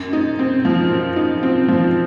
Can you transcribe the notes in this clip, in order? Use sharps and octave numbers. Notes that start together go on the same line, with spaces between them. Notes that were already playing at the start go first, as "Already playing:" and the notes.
Already playing: F#2
D#4
C4
F3
F#2
D#4
C4
F3